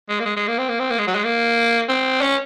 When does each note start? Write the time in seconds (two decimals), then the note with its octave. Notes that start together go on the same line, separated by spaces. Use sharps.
0.09 G#3
0.20 A#3
0.25 G#3
0.36 G#3
0.48 A#3
0.58 C4
0.69 A#3
0.80 C4
0.91 A#3
0.98 G#3
1.07 F#3
1.15 G#3
1.24 A#3
1.89 C4
2.21 C#4